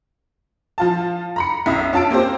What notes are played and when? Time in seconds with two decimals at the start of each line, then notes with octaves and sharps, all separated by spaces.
0.78 F3 F4 A5
1.36 A#5 B5 C#7
1.66 B1 F#2 E5 D#6 C7
1.93 C#4 F4 A5 E6 D7
2.11 A#3 C4 G4 C5